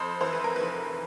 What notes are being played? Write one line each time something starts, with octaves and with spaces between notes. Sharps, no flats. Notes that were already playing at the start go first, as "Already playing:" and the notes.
Already playing: F2 C5
E3 C5
B4
A#4
F1 B4